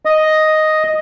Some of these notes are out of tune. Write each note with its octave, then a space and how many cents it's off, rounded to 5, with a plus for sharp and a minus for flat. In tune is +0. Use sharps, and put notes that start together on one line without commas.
D#5 +0